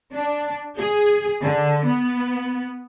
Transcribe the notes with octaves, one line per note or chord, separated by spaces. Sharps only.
D4
G#4
D3
B3